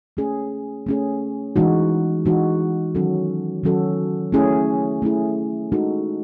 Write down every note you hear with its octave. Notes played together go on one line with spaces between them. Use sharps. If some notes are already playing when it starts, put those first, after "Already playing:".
A3 C#4 G#4
A3 C#4 G#4
E3 G#3 D#4 F#4
E3 G#3 D#4 F#4
D#3 F#3 C#4 F#4 A4
D#3 F#3 C#4 F#4 A4
A3 C#4 E4 G#4
A3 C#4 E4 G#4
G#3 D#4 F#4 A4